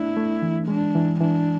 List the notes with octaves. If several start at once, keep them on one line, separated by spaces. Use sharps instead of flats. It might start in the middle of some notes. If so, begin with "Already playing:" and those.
Already playing: A3 B3 D4 E4
A3
E3
G#3 D4
E3
E3 D4